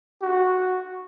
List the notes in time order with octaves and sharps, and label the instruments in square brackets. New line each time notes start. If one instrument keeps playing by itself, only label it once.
[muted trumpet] F#4